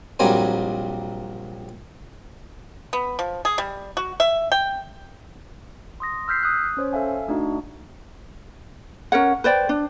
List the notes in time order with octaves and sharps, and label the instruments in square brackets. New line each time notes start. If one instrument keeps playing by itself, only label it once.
[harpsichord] A#1 F#3 G3 A#3 C4 G#5
[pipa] B3
F3
G#4
G3
F#4
E5
G5
[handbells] C6 D#6 A#6
E6 F6 G6 B6 C7
D#6 F#6
C#4 C5 C#5
A4 E5 F5 G#5
A3 D4 D#4 F#4 D#5
[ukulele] C#4 A#4 C#5 F#5
B4 C5 D5 G5
D4